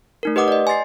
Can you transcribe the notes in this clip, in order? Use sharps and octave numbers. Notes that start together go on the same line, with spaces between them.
A3 D#4 A#4
G4 B4 D#5 F#5 D6 D#6
D5 D#5
G#5 C6 A6 C7